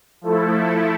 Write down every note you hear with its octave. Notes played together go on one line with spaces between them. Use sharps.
F3 A3 E4 A4